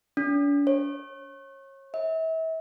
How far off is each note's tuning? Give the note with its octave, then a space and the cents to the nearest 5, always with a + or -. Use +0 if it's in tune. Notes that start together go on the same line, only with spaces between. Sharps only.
D4 -45
C#5 -30
E5 -35